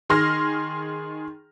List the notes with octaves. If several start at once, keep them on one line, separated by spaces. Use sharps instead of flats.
D#3 G#4 C6 F6 A#6